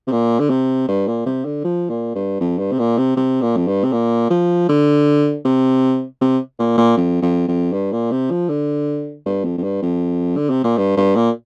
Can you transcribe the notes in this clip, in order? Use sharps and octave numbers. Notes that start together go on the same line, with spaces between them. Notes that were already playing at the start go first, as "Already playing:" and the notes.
C3
A#2
D3
C3
G2
A#2
C3
D3
F3
A#2
G2
F2
G2
C3
A#2
C3
C3
A#2
F2
G2
C3
A#2
F3
D3
C3
C3
A#2
A#2
F2
F2
F2
G2
A#2
C3
F3
D3
G2
F2
F2
G2
F2
D3
C3
A#2
G2
G2
A#2